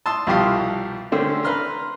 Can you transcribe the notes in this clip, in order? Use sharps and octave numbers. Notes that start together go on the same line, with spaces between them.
A5 C6 D#6 E6
C2 B2 F3 G4 F5 D#6
D3 A3 C4 C#4
B4 A#5 C6 F6